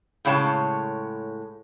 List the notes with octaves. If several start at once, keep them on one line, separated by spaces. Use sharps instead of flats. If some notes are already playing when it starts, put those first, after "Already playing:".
A2 C#3 G#3 C#5 A5